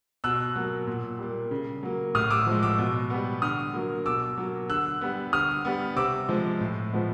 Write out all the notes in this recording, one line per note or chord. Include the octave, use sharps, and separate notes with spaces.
B2 E6 F#6
F#3 A#3
A#2
G3 A#3
C#3
F#3 A#3
A2 D#6 F6
D6 E6
F3 G#3
D6 E6
B2
G3 B3
D3 D#6 F6
F#3 A#3
B2 D6 E6
F#3 A#3
D3 E6 F#6
G3 B3
D3 D#6 F6
G3 B3
C3 D6 E6
F3 G#3
A2
F3 G#3 B3